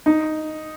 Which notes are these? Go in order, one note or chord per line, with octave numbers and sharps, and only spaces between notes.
D#4